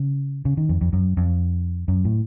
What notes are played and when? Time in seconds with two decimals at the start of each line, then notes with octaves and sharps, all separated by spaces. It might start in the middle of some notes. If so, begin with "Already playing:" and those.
Already playing: C#3
0.45 C#3
0.57 D#3
0.69 F2
0.81 F2
0.93 F#2
1.17 F2
1.88 F#2
2.05 A2